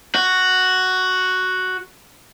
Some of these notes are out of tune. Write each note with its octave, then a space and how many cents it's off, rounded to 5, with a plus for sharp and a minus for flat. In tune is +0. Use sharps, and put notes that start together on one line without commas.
F#4 +0